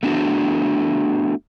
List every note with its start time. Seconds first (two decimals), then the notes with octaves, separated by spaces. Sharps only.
0.03 A3 B3 D4 F#4